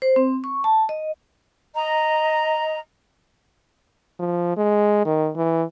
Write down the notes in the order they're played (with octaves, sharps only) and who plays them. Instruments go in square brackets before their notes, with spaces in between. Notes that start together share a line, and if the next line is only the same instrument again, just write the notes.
[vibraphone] C5
C4
C#6
A5
D#5
[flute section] D#5 A#5
[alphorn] F3
G#3
D#3
E3